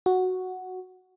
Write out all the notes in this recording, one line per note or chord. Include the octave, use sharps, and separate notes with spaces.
F#4